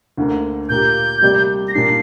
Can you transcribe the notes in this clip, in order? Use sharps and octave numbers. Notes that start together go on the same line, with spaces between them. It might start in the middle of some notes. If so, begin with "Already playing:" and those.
D2 D3 A#3
A#2 A#3 G4 G6
C3 G3 A#3 G4 D5
A#6
A#2 A#3 D4 G4 C7